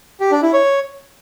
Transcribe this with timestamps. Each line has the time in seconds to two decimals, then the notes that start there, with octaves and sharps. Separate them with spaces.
0.20 G4
0.31 D4
0.42 E4
0.53 C#5